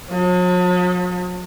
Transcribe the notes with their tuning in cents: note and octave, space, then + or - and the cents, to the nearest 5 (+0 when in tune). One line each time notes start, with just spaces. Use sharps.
F#3 -45